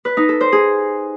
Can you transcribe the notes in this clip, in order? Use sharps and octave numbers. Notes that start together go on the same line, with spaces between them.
B4
D#4
A4
C5
G#4